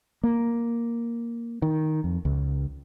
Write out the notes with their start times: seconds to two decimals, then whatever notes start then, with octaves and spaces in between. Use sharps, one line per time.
0.24 A#3
1.62 D#3
2.04 F2
2.25 C#2